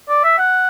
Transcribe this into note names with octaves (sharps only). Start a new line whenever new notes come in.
D5
E5
F#5